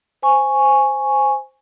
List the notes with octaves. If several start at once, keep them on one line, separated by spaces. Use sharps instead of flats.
C5 G#5 C#6